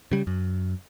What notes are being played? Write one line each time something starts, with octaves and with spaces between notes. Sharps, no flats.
C#3 G3
F#2